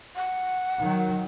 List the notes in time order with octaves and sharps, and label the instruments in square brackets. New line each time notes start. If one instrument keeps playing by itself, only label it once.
[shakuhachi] F#5
[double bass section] D#3 F#3